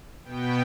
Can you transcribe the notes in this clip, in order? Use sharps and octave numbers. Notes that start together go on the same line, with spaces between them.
B2 B3 G5